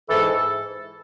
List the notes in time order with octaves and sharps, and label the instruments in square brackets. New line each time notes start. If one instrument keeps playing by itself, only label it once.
[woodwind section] G#2 E3 A4